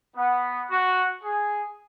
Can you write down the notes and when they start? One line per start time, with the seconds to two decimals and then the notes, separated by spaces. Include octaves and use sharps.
0.15 B3
0.69 F#4
1.22 G#4